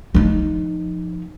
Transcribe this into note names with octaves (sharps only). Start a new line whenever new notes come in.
F3 D#4